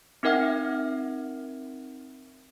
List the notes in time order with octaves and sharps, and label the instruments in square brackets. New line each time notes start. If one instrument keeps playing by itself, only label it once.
[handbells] C4 D#4 A#4 E5 F#5 F6